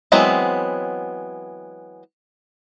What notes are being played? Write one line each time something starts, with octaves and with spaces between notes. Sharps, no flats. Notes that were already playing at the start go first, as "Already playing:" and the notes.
E3 F#3 G#3 B3 C4